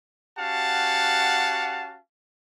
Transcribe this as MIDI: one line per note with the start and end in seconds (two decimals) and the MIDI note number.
0.38 1.98 61
0.38 1.98 66
0.38 1.98 67
0.38 1.98 77
0.38 1.98 78
0.38 1.98 81